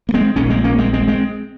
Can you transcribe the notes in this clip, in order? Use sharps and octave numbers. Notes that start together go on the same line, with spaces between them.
A#3
G#3 C4
A#1 G#2 A#3 C#4
G#3 C4
A#3 C#4
G#3 C4
G#3 C4
G#3 C4